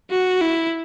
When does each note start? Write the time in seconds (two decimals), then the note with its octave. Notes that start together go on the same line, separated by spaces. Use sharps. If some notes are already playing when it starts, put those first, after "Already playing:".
0.11 F#4
0.41 E4